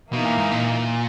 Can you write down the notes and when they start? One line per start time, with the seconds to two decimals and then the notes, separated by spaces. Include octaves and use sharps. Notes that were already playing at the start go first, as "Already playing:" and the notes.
0.12 B2 E3 A#3 D#4
0.25 A#2
0.38 G#2
0.52 A#2